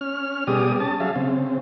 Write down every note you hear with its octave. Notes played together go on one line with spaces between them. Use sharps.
C#4 F6
B2 G3 G4 G#4 D5 D#6
C#4 A5
F#3 G#4 E5 F5
C#3 C4